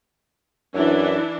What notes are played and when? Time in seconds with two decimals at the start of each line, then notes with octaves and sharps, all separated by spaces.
0.74 F#2 E3 D4 E4